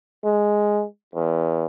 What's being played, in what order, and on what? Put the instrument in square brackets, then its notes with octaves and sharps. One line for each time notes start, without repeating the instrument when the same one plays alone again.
[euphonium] G#3
E2